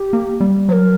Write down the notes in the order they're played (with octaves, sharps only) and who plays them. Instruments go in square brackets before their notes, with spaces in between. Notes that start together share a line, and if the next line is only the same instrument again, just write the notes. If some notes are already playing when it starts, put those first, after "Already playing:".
Already playing: [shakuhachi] G4
[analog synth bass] A#3
G3
[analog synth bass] F#3 [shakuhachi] C5
[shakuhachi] A#4